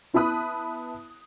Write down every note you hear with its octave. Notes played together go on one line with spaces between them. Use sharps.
B3 E4 A5 B5 D#6 F#6